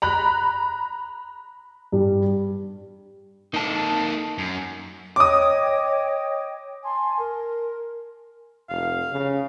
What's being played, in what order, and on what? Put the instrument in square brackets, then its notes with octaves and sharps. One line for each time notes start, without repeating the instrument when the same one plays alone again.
[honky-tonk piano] A#5 B5 F#6
[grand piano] G2 G3
[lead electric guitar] A#3 A4 [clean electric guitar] D#4 A5
[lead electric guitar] F#2
[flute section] C#5 D#5 G5 [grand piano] D6 D#6
[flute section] G#5 A5 C6
A#4
[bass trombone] F1 [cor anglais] F5
[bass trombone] C#3